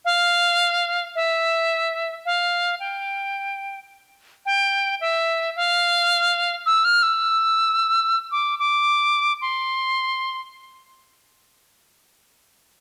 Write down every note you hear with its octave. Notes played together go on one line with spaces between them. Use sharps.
F5
E5
F5
G5
G5
E5
F5
E6
F6
E6
D6
D6
C6